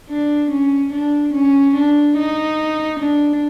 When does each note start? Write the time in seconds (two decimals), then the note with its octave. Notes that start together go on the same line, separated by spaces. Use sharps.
0.09 D4
0.51 C#4
0.92 D4
1.34 C#4
1.75 D4
2.17 D#4
3.00 D4